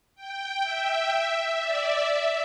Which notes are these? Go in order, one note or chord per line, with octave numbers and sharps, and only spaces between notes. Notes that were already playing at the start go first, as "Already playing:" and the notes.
G5
E5
E5
D5
E5